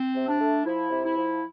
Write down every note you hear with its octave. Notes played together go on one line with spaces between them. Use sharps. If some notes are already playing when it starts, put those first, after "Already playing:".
Already playing: C4
C3
D4
A3
F3 E4
C3
E4
F3